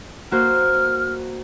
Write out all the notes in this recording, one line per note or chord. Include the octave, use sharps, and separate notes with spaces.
A#3 F#4 C5 F6